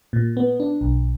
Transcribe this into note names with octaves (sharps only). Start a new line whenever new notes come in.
A#2
B3
D4
B1